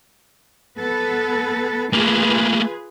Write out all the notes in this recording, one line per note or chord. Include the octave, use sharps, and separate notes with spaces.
B3 A4 B4
A3 A#3 F4 G#4 B4